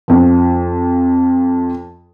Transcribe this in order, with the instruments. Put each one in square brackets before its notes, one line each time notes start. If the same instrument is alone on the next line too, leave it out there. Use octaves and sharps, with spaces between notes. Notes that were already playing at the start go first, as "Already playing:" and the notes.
[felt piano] F2 F3